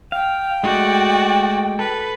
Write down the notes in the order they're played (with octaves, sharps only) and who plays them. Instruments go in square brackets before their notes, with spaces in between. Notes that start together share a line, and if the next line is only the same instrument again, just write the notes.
[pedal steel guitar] F5 [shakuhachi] G5
[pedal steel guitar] G#3 A3 [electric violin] F#4 D5
[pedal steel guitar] A4 [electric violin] B4